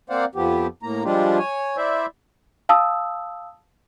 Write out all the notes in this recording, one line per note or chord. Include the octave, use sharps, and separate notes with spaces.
A#3 C4 C5 D5 F5 F#5
F2 F3 B3 G4
A2 A#3 A#5
F3 G3 G#3 D4 F4 G4
C#5 G#5
E4 C5 D5 E5
F5 A5 D#6 E6